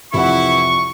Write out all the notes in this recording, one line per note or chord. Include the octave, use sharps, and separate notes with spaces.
C2 F2 E3 E4 F#5 C#6